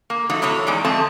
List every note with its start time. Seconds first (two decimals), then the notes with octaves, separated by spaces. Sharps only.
0.10 A#3
0.30 F3 F#3 A3 D#4
0.42 A2 C3 F#4 C#5
0.67 E2 G#3 D#4 D5
0.85 F2 A3 C4 D#5 A5